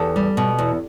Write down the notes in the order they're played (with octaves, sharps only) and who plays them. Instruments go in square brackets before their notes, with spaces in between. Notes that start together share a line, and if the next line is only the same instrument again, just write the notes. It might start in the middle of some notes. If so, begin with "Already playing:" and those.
Already playing: [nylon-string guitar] E2 G4 A4
G3
B2
E2